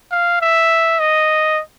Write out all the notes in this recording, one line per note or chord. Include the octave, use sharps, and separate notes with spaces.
F5
E5
D#5